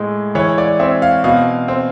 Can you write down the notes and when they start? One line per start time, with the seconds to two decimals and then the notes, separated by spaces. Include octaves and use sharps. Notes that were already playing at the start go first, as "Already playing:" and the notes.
Already playing: A2 G#3
0.35 E3 C#5
0.58 D5
0.80 C4 E5
1.02 F5
1.24 B2 F5
1.68 C4